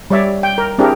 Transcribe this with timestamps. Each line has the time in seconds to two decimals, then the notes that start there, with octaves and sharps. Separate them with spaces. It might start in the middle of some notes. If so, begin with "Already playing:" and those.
0.10 G3 C#5 D5 E5
0.43 G5
0.58 A#4
0.78 C4 D4 E4 G4 G#4 A#4